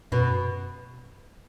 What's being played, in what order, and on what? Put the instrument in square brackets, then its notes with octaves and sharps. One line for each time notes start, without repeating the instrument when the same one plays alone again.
[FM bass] F#2 [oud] B2